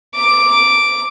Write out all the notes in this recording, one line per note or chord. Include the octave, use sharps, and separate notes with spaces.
D6